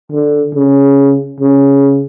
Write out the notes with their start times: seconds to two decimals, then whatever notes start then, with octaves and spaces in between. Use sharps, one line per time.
0.12 D3
0.55 C#3
1.41 C#3